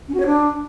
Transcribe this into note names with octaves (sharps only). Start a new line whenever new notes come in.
C#4
F#4
C#5
D4